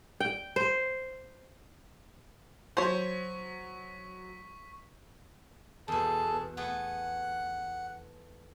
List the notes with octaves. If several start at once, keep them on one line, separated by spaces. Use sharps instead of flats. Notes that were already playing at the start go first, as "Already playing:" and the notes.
G5
C5
F#3 C5 C#5 C#6 B6
E2 B2 G#4 A4 A5
A3 B3 G#4 F#5